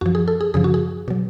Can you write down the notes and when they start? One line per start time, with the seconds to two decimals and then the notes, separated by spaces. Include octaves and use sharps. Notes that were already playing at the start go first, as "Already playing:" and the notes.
0.01 F#2 F3 F#4
0.15 G#4
0.28 A4
0.41 G#4
0.54 F#2 C#3 F3 G#4
0.64 F#4
0.74 G#4
1.08 B2 F#3